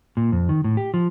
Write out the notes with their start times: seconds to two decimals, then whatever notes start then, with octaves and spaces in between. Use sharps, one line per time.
0.17 A#2
0.32 F2
0.49 D#3
0.64 A2
0.77 G4
0.94 F3